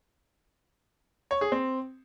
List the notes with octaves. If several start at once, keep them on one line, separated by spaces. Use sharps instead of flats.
C#5
G#4
C4